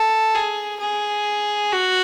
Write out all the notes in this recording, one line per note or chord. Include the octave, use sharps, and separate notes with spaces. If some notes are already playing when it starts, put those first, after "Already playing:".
Already playing: A4
G#4
G#4
F#4